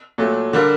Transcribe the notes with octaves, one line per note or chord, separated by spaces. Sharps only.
A#2 F#3 A3
D3 G3 A#3